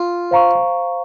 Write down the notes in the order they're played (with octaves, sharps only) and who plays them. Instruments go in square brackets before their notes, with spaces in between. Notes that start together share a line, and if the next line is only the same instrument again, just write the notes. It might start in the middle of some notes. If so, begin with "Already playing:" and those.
Already playing: [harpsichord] F4
[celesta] C5 F5 A#5 C#6